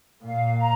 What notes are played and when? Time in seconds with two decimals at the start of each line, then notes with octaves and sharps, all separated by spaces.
0.22 A#2 F5
0.58 A#5